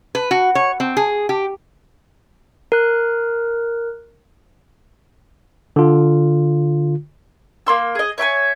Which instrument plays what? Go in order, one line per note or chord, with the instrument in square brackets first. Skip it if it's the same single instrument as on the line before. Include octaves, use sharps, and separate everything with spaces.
[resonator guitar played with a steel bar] B4
F#4
C#5
C4
G#4
G4
[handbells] A#4 F#6
[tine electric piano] D3 F4
[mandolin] A#3 C6 E6
G#4 D#5
C#5 E5 G5 G#5